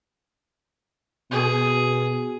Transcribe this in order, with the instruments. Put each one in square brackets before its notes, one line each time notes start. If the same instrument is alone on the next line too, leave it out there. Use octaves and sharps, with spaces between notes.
[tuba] B2 [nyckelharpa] G#4